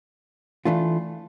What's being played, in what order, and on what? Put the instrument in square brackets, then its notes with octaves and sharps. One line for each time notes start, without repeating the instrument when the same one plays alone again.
[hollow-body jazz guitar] E3 A3 D4 F4